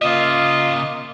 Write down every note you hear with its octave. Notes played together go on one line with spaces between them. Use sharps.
C#3 A#3 F4 D#5 E5